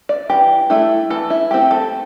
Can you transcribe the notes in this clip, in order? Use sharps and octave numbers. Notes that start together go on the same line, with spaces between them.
D5
E3 G4
A3 D4 E4
E3 A4
E4
A3 C4 G4
A4